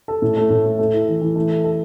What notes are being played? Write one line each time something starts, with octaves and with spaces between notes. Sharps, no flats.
A4
A2
A3
A2
A3
A3
E4
E3
E3
A3
A4
A4